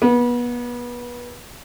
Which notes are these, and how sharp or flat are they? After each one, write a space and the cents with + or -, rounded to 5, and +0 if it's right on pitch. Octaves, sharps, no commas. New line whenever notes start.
B3 -30